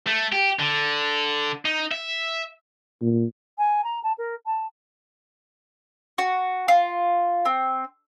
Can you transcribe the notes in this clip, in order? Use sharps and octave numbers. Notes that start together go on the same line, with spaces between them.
A3
G4
D3
D#4
E5
A#2
G#5
A#5
A5
A#4
A5
F#4
F4
C4